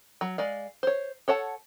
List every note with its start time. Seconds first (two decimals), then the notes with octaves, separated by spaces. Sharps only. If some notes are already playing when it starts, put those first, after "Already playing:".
0.21 F#3
0.38 G#3 D5 F5
0.83 C5 C#5
1.28 A4 C#5 F#5 A5